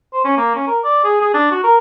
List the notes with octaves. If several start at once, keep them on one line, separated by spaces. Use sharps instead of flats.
C5
C#4
A#3
C#4
A#4
D5
G#4
G#4
D4
F#4
A#4